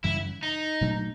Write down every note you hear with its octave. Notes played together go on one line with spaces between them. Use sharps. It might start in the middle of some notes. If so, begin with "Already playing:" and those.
F#2 C#3 E3 G3 E4
D#4
A#2 F#3 A3 D4